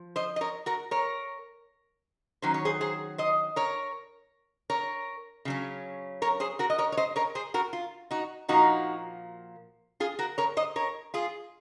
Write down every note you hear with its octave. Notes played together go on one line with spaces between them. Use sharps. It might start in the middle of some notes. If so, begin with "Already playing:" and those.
Already playing: F3
C5 D#5
D#5
A#4 C#5
F#4 A#4
A#4 C#5
D#3 F#3 C#4 C5
C#5
G#4 C5
G#4 C5
C5 D#5
A#4 C#5
A#4 C#5
C#3 F#3 C#4
A#4 C#5
G#4 C5
F#4 A#4
D#5
A#4 C#5
C#5
C5 D#5
A#4 C#5
G#4 C5
F#4 A#4
F4
D#4 F#4
A#2 F3 A#3 D#4 F#4
F4 G#4
F#4 A#4
A#4 C#5
C5 D#5
A#4 C#5
F4 G#4